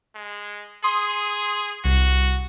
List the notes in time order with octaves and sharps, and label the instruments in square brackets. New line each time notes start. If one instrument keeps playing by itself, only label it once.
[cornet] G#3
[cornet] G#4 [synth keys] C6 D#6
[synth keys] C2 [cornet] F#4